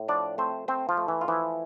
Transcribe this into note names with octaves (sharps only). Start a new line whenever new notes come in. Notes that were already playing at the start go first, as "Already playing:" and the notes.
Already playing: A2
F3 D4 D5
A3 C4 C5
A3 C4 C5
F3 F4
A3
E3 E4
F4
E3 F3 E4